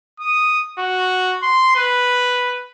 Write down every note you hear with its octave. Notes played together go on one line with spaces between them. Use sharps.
D#6
F#4
C6
B4